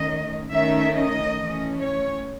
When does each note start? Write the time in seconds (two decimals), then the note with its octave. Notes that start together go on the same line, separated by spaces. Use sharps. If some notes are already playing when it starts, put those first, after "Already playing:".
Already playing: D#3 A3 C#4 D#5
0.52 D#3 A3 C#4 E5
0.95 D#5
1.37 E3 A3 C#4
1.80 C#5